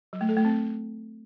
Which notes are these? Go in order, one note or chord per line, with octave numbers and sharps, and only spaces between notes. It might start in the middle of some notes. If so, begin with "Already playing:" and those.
F#3
A3
A4
A3
C4